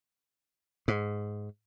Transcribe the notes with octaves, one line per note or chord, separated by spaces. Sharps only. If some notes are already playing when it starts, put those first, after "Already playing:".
G#2